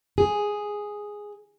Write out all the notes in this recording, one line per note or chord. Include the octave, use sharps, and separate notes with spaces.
G#4